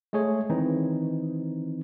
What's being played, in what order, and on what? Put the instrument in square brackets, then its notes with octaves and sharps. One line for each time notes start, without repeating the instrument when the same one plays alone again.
[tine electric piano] G#3 A3 G#4 C#5
D#3 E3 C4 D#4